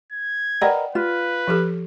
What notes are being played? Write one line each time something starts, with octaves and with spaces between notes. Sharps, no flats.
G#6
A#4 B4 D5 D#5 F#5 G5
F4 B4
F3 G4 A4